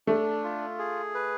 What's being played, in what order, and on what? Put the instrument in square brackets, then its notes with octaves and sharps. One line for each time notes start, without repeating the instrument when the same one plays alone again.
[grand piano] A3 [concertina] D4
[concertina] F4
G#4
B4